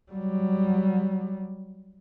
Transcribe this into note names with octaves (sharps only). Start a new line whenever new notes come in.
F#3 G3